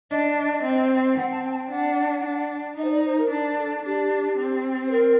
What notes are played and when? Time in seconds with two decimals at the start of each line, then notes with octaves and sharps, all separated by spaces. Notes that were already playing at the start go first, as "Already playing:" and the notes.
0.11 D4 D#5
0.64 C4
1.17 C4 F#5
1.31 A5
1.44 G5
1.52 A5
1.58 G5
1.71 D4 F#5
2.24 D4
2.77 D#4 D#5
2.84 C5
2.91 D5
3.04 C5
3.18 A#4
3.31 D4
3.58 A4
3.85 D4 G4
4.38 C4
4.87 C5
4.91 A#4